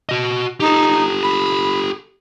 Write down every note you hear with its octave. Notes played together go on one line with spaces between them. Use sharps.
F#4 D#5
D#4 G4 A4
B5